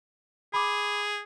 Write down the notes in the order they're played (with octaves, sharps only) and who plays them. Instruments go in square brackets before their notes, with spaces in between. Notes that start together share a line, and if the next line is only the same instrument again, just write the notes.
[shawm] G#4 [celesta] B5 D6